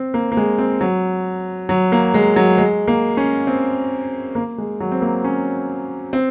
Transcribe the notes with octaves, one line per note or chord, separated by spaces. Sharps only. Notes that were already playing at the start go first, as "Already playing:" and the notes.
Already playing: C4
A#3
A#3
G#3
C4
F#3
F#3
A#3
G#3
F#3
G#3
A#3
C#4
C4
A#3
G#3
F#3
C4
A#3
C#4
C4